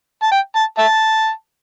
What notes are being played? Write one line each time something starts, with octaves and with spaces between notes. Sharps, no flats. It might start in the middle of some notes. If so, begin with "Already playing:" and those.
A5
G5
A5
E5 A5